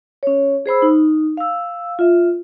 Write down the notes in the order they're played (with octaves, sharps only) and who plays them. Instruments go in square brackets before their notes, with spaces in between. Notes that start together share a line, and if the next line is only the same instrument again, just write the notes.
[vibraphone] C#4 C#5
G#4 C5 B5 E6
D#4
F5 E6
F4 E5